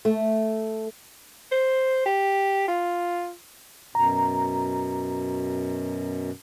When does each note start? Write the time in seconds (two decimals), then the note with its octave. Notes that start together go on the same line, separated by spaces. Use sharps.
0.05 A3
1.52 C5
2.06 G4
2.68 F4
3.95 F#2 B2 A#5